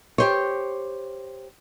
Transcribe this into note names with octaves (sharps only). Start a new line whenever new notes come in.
G4 C5 C#5